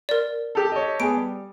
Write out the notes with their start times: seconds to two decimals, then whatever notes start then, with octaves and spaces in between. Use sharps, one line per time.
0.09 A#4 D5
0.55 G4 A4
0.72 C#5 D#5
1.00 B3 G#4 D7
1.17 G3